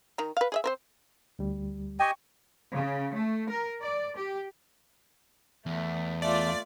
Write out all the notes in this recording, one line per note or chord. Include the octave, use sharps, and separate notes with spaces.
D#3 A#5
B4 F5
G#4 D#5 E5
C4 A#4 C5
D2 G3
G4 D#5 G5 G#5 C#6
C#3
A3
A#4
D5
G4
E2 A3
A3 F4 D5